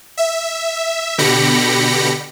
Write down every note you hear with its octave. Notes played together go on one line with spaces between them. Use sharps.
E5
B2 D3 G4 B5 A#6 C#7